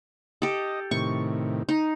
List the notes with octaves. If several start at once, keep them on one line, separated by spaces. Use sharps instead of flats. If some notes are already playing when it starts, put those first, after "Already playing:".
G4 A4 D#5
A2 C3 D#3 C#6
D#4